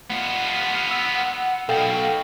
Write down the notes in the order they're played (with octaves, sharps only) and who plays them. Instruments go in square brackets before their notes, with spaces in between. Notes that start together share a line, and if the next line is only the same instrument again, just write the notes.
[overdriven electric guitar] B3 F4 [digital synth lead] F#5
[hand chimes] E6
[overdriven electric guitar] B1 B2 [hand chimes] A4 G5 [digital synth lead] F5